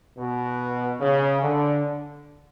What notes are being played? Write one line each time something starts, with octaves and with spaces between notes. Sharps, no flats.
B2
C#3
D3